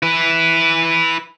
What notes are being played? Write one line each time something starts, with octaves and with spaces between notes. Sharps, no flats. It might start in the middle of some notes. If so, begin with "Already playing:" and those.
E4 B4